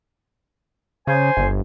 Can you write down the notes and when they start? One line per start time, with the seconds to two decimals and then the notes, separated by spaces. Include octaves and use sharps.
1.07 C#3 C5 G#5
1.37 G1